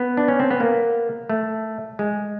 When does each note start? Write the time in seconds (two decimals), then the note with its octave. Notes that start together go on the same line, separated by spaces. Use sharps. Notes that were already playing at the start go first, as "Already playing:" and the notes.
Already playing: B3
0.17 D4
0.28 C#4
0.40 C4
0.51 B3
0.60 A#3
1.29 A3
1.99 G#3